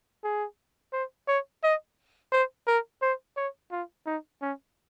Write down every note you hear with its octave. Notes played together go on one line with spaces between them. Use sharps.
G#4
C5
C#5
D#5
C5
A#4
C5
C#5
F4
D#4
C#4